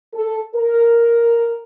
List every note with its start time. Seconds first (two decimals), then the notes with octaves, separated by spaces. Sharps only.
0.14 A4
0.54 A#4